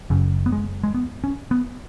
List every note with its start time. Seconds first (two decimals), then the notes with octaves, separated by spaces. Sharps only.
0.10 F#1 F#2 C#3
0.46 B3
0.52 G#3
0.84 G#3
0.95 B3
1.24 C#4
1.51 B3